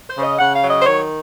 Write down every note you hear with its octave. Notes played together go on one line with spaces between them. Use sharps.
C5
C#3
D#5
C#3 F#5
F5
F#3
D#5
C5
D#3 C#5